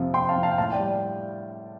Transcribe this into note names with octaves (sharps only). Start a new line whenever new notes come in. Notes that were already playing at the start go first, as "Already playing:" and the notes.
Already playing: F2 C3 F3
F2 G5 C6
F5 A5
C3 F3
F5 A5
G5
A2 F5 A5
D5 G5
G3
D5